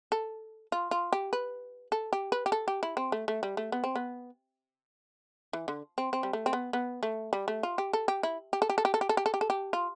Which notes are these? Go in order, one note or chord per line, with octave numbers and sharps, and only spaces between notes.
A4
F4
F4
G4
B4
A4
G4
B4
G4
A4
G4
E4
C4
A3
A3
G3
A3
B3
C4
B3
E3
D3
C4
C4
G3
A3
C4
B3
B3
A3
G3
A3
F4
G4
A4
G4
E4
G4
A4
G4
A4
G4
A4
G4
A4
G4
A4
G4
A4
G4
F4